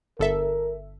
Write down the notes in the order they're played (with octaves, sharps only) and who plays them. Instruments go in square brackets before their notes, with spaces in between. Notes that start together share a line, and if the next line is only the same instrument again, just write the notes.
[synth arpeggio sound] G1 A4 E5 [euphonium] A#4